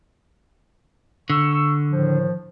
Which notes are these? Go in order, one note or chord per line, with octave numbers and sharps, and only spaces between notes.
D3 C#6 E6
A2 D#3 F3